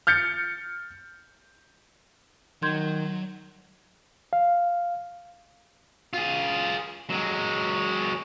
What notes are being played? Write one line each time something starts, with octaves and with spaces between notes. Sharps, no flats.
F6 G6 A6 C#7
D#3 F#3 C6 G6 G#6
F5
F4 G#4
F#3 G#3